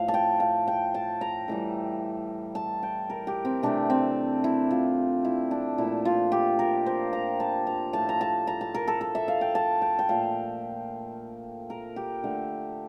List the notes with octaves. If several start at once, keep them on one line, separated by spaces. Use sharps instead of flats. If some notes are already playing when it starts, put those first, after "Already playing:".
Already playing: A2 F3 A3 F5
A5
G5
F5
G5
A5
A#5
A2 E3 G3
A5
G5
A#4
G4
C4
C3 E3 A3 D4
C4
E4
F4
E4
D4
A#2 F3 A3 E4
F4
G4
A#4
C5
A#5
A5
A#5
A2 F3 A3 A5
A#5
A5
A#5
A5
A#4
A4
A4
E5
F5
G5
A5
G5
G5
A#2 F3 A3 F5
A#4
G4
D3 A3